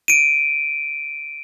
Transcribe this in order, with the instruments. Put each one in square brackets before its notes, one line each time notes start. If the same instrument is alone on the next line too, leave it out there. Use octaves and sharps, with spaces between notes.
[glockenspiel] D7 D#7